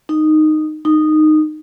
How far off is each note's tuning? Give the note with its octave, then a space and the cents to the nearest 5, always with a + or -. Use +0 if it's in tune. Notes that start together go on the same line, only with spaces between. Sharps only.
D#4 -10
D#4 -15